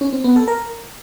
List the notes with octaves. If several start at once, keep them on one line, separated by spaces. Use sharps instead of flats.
C#4
C4
B3
A4
A#4